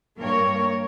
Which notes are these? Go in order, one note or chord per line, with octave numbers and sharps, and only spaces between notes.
G2 A#3 A#4 C#5